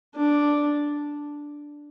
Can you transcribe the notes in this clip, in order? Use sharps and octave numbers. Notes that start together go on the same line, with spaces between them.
D4